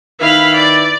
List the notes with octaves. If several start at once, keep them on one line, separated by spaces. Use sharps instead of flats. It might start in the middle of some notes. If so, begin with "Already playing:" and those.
D#3 E4 B4 F5 B5
D5